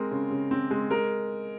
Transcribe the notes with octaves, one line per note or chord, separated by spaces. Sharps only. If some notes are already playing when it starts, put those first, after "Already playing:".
Already playing: G#3 C4 A#4
C#3
C#3
C4
G#3
G#3 A#4